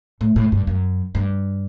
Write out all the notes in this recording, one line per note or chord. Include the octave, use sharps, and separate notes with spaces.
A2
A2
G2
F#2
G2